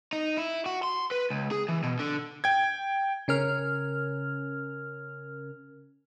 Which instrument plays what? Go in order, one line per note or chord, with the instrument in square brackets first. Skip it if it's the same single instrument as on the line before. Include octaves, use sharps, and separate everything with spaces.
[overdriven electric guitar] D#4
E4
F#4
C6
B4
C#2
G#4
E3
B2
D3
[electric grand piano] G5 G#6
[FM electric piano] C#3 C#4 A#4 F6